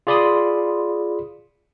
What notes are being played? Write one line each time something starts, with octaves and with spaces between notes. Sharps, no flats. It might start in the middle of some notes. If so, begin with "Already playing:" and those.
F4 G#4 D5 B5 C6 D#6